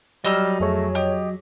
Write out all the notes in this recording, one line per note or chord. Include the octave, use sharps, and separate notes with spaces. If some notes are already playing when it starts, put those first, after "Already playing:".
F#3 G3 D#5 E6 F6
F2 A3 G#4 C#5
G4 D#5